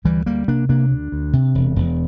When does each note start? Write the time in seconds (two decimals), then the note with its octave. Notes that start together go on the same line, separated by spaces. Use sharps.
0.05 D2 E3 G3
0.26 D2 G3 A#3
0.48 C3 A#3 D4
0.69 C3 A#3 D4
0.90 D2
1.12 D2
1.33 C3
1.55 E1
1.76 E1